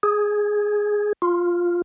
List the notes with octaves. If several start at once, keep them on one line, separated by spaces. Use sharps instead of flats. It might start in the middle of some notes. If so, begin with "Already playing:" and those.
G#4
F4